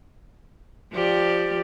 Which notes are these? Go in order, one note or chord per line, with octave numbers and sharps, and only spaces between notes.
F3 G4 D5